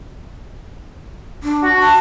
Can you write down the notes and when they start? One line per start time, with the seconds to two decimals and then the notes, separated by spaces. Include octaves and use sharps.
1.43 D4
1.63 F#4
1.79 A5